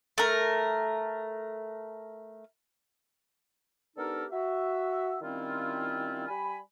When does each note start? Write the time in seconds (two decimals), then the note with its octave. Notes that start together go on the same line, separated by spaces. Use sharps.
0.18 A3 A#4
3.97 B3 D4 D#4 G4 A4 A#4
4.32 F#4 E5
5.21 D#3 G3 C4 C#4 E4 F4
6.28 G3 G#5 B5